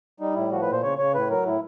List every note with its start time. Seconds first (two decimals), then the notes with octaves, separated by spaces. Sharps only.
0.20 G3 D#4
0.35 A2 E4
0.52 F3 F#4
0.62 B4
0.67 A#2
0.72 C5
0.82 C#3 C#5
0.98 C#3 C#5
1.14 A2 B4
1.30 F#3 A#4
1.46 A2 E4